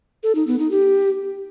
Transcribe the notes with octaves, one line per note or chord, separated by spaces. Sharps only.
A4
D#4
B3
D#4
G4